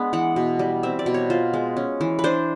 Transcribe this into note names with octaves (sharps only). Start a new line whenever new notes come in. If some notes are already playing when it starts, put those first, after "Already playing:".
Already playing: G#3 B3 D4
E3 F#5
B2
G3
C4 E5
D5
B2
C#5
F4 C5
G#3
C#4
E3
B4
D4 C5